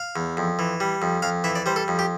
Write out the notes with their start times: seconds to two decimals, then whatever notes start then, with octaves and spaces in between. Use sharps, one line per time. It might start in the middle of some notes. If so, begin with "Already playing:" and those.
Already playing: F5
0.16 E2
0.37 F2
0.59 E3
0.80 G3
1.02 F2
1.22 F2 F5
1.44 E3 E5
1.55 D5
1.66 G3 C5
1.76 A4
1.88 F2
1.99 G4